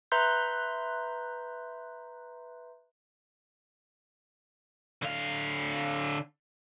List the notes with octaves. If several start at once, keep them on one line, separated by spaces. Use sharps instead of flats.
B4 E5 A#5 C6 F#6 G6
D3 F5